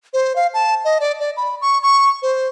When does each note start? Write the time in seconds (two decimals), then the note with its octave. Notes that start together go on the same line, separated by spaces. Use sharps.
0.13 C5
0.36 F5
0.54 A5
0.85 D#5
1.00 D5
1.20 D5
1.37 B5
1.61 C#6
1.83 C#6
2.22 C5